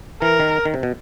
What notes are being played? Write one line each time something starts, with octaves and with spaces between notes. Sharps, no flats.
E3 A#4
D#3
D#3
C3
B2